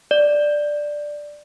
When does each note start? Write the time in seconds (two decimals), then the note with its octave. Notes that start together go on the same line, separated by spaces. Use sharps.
0.11 D5